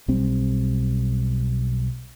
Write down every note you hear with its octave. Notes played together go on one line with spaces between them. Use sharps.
B1 G3 C4